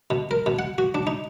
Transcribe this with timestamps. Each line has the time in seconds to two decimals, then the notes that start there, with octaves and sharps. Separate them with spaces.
0.10 B2
0.31 A#4
0.46 B2
0.59 F#5
0.78 F#4
0.95 D4
1.07 D#4